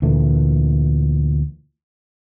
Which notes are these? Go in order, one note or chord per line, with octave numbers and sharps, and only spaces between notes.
D2 A#2 E3 A3